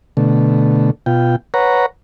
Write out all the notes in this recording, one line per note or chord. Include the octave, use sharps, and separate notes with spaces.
B2 D3 A3
B2 F4 G5
B4 C#5 F#5 A#5